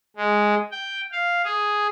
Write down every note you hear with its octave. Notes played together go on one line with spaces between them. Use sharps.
G#3
G5
F5
G#4